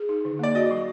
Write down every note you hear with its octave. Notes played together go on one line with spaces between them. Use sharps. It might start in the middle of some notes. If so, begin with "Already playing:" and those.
Already playing: G#4
D#4
D3
A#3 D5
F#4 D#5
F#3